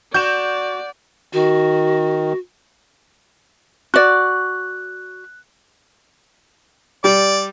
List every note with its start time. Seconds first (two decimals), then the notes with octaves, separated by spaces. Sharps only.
0.14 F#4 D5 G6 E7
1.33 D#3 F#4
3.94 F#4 D5 F#6
7.04 G3 D5